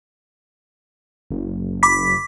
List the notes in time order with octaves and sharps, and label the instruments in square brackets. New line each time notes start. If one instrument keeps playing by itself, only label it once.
[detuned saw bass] F#1
[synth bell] B5 D6 B6